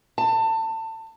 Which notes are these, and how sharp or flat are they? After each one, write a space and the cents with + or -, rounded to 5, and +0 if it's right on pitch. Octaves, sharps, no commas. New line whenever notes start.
A5 +25